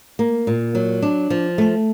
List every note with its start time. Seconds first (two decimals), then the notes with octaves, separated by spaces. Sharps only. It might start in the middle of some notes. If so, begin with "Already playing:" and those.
0.19 A#3
0.47 A#2
0.75 F#3
1.02 D4
1.30 F3
1.58 A3